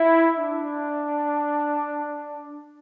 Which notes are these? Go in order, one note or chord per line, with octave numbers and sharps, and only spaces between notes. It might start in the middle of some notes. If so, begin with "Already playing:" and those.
Already playing: E4
D4